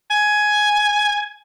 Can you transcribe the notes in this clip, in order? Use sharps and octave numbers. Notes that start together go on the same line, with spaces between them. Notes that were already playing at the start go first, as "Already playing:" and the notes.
G#5